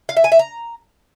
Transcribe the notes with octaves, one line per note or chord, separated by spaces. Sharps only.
F5
E5
G#5
E5
A#5